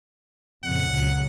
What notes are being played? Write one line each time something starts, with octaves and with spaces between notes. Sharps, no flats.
F2 A#2 C#3 F#5
C#2 F#3